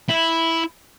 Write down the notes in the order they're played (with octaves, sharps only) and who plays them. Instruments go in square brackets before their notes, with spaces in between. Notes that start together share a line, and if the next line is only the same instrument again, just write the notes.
[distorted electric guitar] E4